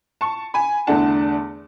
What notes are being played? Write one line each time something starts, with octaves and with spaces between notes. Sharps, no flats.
A5 C#6
G#5 B5
E2 D3 A3 D4 F#5 A5